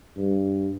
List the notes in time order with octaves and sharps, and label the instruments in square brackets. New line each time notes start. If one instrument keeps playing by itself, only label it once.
[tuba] G2